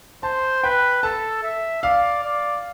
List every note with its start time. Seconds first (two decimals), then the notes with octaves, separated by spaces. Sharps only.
0.23 C5 A5
0.64 B4 G5
1.03 A4 A5
1.43 E5
1.83 D5 F5
2.24 D5